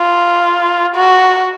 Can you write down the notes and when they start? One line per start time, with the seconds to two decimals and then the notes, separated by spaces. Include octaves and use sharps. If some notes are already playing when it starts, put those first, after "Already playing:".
Already playing: F4
0.96 F#4